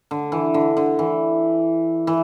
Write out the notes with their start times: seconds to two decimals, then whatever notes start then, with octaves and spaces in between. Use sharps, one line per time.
0.11 D3
0.32 E3
0.54 D3
0.77 D3
0.99 E3
2.07 E3